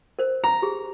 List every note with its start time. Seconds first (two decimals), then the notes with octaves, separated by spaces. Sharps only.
0.19 A#4 C5
0.44 A#5
0.62 G4 G#4